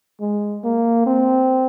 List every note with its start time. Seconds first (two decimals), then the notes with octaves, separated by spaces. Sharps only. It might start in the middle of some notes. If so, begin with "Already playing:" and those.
0.21 G#3
0.64 A#3
1.06 C4